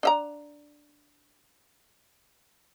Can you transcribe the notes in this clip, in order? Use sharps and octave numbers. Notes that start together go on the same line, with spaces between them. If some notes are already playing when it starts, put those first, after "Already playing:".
D4 E5 A#5